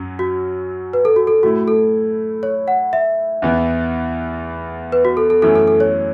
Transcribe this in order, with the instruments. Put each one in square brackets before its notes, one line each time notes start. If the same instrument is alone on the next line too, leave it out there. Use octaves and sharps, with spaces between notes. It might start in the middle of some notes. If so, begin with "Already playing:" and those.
Already playing: [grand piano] F#2 F#3 C#4
[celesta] F#4
B4
A4
F#4
A4
[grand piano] A2 A3 E4 [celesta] F#4
[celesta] A4
C#5
F#5
E5
[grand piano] E2 E3 B3 E4
[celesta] B4
F#4
A4
A4
[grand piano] F#2 E3 A3 C#4 E4 [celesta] A4
[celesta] A4
A4
C#5